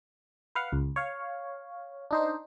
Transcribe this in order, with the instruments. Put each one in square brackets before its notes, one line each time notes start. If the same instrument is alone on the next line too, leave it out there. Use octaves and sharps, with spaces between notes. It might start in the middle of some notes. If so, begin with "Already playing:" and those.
[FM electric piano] B4 F5 F#5
C#2
C#5 F5
D4 D#4 C5